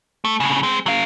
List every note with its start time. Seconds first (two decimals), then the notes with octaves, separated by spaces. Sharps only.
0.25 A3
0.40 A2 C#3
0.63 G#3 C4
0.86 F#3 F5